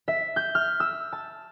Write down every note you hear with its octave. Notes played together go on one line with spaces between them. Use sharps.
E5
G6
F6
E6
A5